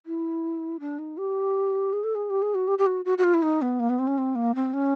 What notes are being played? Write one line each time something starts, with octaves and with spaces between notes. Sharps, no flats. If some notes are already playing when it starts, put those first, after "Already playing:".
E4
D4
D#4
G4
G#4
A4
G#4
G4
G#4
F#4
G4
G4
F#4
F#4
F#4
F4
E4
D#4
B3
A#3
B3
C4
C#4
C4
A#3
C4
C#4